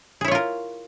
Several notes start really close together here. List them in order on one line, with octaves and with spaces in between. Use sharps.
G#4 E4 C#5 F4 A#4